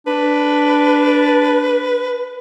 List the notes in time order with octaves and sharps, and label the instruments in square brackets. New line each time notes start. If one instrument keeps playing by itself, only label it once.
[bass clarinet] D4 [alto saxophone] B4